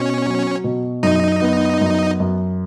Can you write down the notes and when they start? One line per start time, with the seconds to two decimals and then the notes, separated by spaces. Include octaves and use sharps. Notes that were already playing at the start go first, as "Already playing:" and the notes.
Already playing: B2 C#4 C#5
0.26 F#3
0.64 B2
1.03 F#2 D#4 D#5
1.42 B3
1.81 F#2
2.20 F#2